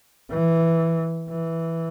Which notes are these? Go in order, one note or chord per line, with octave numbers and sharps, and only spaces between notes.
E3
E3